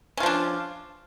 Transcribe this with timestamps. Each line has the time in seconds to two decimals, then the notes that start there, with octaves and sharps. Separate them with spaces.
0.17 C#4
0.20 F4
0.23 F3
0.26 D4